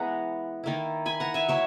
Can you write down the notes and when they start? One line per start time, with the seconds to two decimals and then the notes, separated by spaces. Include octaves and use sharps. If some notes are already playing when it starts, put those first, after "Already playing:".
Already playing: E3 G#3 B3 F#5 A#5
0.64 D#3 A#3 E4
1.06 G#5 B5
1.20 F#5 A#5
1.34 E5 G#5
1.48 F#3 A#3 E4 C#5 E5